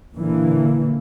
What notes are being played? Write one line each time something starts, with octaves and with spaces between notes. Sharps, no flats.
A#2 D3 E3 A#3